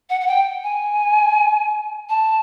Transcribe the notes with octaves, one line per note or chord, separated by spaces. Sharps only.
F#5
F#5
G5
G#5
A5